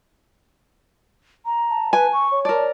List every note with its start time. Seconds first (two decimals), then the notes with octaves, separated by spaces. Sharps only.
1.45 A#5
1.70 A5
1.93 B4 G#5
2.13 C#6
2.31 C#5
2.45 A#4 D5 A5